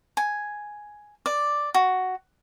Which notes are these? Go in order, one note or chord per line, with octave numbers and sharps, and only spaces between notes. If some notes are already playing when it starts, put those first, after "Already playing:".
G#5
D5
F#4